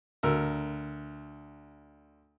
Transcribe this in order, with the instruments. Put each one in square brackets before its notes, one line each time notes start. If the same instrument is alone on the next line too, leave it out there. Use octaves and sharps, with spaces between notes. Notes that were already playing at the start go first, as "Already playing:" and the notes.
[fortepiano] D2 A#4 E6